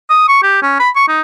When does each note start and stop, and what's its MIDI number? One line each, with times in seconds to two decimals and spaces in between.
0.10 0.27 87
0.28 0.40 85
0.43 0.61 67
0.63 0.75 61
0.79 0.90 83
0.96 1.07 85
1.08 1.21 63